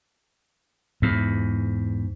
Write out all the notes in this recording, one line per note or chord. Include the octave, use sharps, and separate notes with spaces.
E2 G#2